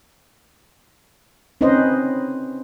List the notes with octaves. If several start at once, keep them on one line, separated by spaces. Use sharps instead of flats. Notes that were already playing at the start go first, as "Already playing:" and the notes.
C4 C#4 D#4 B4 C5 D#5